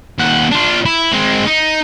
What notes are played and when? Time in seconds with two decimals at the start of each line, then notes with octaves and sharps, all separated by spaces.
0.19 D#2 F#5
0.52 D4 F4
0.85 E4
1.12 G#3 C4
1.46 D#4